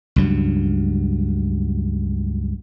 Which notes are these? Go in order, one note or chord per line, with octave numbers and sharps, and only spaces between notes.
C#2 G2 F#3